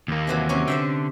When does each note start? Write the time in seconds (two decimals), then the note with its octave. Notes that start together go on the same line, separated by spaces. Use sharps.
0.08 D#2 A#3
0.27 C3 E3 F#3
0.49 C3 F#3 C#4
0.68 D3 C5 E5 G5